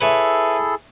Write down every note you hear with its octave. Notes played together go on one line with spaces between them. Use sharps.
E4 G#4 A4 B4 C#5 E5